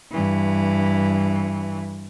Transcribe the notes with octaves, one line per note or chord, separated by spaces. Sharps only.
G2 E3